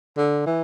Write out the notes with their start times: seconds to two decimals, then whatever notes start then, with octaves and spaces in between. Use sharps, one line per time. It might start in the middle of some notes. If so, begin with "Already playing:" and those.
0.17 D3
0.46 E3